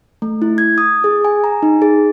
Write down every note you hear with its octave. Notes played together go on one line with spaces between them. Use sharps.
A3
E4
G#6
D#6
G#4
G#5
A#5
D#4
G#4